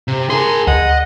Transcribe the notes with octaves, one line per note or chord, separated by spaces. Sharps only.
C3
G#4 A#4 C6
D2 D#5 F#5